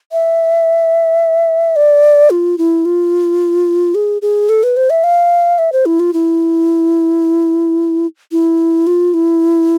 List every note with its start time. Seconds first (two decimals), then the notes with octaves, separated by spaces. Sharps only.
0.12 E5
1.76 D5
2.30 F4
2.58 E4
2.85 F4
3.95 G#4
4.22 G#4
4.49 A4
4.63 B4
4.77 C5
4.90 E5
5.04 F5
5.58 E5
5.72 C5
5.86 E4
6.00 F4
6.13 E4
8.32 E4
8.87 F4
9.14 E4